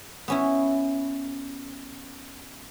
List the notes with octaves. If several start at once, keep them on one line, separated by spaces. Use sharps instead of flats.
B3 C#4 E4